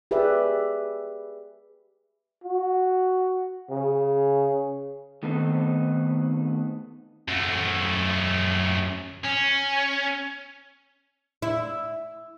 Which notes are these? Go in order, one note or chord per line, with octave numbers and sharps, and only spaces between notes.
G4 G#4 B4 D5 E5
F#4
C#3
D#3 A3 B3 C4 D#4
F#2 A3
C#4
E4